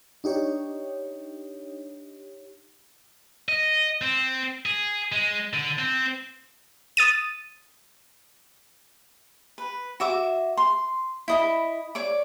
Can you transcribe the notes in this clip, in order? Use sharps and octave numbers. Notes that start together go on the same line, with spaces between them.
D4 D#4 G4 C#5
D#5
C4
G#4
G#3
D3
C4
D#6 A6 D#7
B4
F#4 E5 D6
C6
E4 D#5 B5
C#5 D5 D6